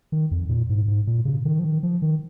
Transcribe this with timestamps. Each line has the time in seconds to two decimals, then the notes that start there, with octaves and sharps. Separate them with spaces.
0.12 D#3
0.31 F2
0.49 A#2
0.69 G#2
0.88 G#2
1.07 A#2
1.25 C#3
1.45 D#3
1.59 F3
1.64 D#3
1.83 F3
2.02 D#3